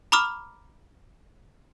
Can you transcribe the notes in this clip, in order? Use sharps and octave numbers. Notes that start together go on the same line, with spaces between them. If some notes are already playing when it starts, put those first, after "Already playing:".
A#5 B5 D6 D#6 F6